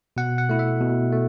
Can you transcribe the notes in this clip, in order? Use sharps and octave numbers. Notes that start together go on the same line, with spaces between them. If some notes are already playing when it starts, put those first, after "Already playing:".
B2 F#5
F#5
A3 E4
E5
B2
A3